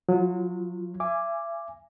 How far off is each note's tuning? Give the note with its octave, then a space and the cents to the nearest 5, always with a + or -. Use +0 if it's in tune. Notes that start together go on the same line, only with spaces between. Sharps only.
F#3 -30 F4 -20
E5 +40 G#5 -10 D6 +0